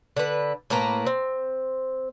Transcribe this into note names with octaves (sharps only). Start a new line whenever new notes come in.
D3 B4
A2 A#3 B4 A#5
C4